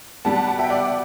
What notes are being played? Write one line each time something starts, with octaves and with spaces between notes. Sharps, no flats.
B2 G3 F#5 A5
F#5 A5
F#5 A5
E5 G5
D5 F#5